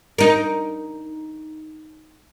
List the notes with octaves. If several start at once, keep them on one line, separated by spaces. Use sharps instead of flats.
D#4 A#4